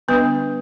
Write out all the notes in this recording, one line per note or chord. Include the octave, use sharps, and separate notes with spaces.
D3 G3 B3 D4 B4